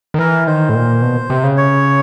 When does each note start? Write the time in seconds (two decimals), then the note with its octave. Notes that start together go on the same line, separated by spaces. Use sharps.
0.14 D#3
0.19 E3 A#4
0.47 D#3 C5
0.69 A2
0.75 A#2
1.02 B2
1.30 C3
1.44 C#3
1.57 C#5